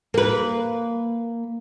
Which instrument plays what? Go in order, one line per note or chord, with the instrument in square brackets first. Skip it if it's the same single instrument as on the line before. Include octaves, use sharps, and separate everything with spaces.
[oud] A#3 B4